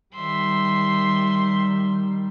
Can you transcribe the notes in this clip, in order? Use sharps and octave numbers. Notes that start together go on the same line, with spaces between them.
D#3 G3 E5 C6